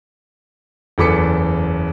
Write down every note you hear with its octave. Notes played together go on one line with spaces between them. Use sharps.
F#1 E2 A4 D6 B6 C#7